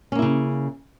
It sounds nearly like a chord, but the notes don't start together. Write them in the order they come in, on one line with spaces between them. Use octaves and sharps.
C#4 A#3 E4 C#3